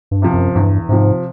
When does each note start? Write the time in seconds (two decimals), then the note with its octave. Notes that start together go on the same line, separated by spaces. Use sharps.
0.11 G2
0.22 C3 F3
0.33 F#2
0.55 E2 G2
0.89 G#2 C3 F3